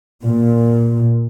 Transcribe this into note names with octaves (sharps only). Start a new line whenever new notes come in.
A#2